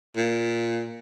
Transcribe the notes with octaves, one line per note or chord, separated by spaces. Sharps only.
A#2